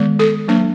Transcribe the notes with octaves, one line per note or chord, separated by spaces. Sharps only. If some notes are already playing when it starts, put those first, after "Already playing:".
Already playing: D#3 G#3 B3
A4
F#3 A#3 D4